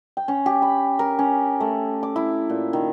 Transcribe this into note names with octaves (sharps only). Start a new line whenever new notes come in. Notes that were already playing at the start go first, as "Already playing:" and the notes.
G5
C#4
G4
B5
A#4
C#4
A3
D6
E4
A#2
D#3